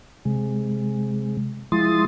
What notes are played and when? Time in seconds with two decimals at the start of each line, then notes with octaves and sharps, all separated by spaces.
0.25 C3 G#3
1.72 F3 G#3 E4 C6 D#6 A6